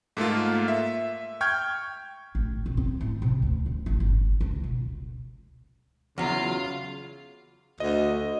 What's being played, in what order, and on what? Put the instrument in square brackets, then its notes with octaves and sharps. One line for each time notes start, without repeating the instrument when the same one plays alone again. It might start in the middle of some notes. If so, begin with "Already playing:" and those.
[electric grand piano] G#2 A3 A#3 F4
E5
G5 C#6 F6 G6 G#6
[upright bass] A1
B1
C4
A2
C3
D2
D1
A1
G1
C#2
B2
[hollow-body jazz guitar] E2 F#3 [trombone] C#3 [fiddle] F4 F5
[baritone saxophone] D2 [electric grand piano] D#5